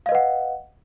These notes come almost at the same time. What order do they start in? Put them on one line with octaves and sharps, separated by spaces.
F5 D#5 B4 F#5